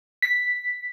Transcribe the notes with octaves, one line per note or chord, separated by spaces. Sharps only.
B6